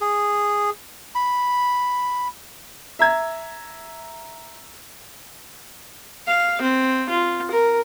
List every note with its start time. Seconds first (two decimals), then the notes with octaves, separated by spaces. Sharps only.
0.01 G#4
1.15 B5
2.99 E5 A#5 G#6
6.27 F5
6.62 C4
7.10 F4
7.51 A#4